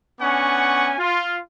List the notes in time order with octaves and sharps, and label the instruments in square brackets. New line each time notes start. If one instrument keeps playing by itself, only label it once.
[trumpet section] B3 C#4 D4 F#5 G#5 C#6
F4